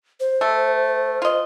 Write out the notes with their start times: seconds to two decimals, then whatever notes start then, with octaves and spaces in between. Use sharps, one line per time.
0.20 C5
0.41 A3
1.22 F4 D#5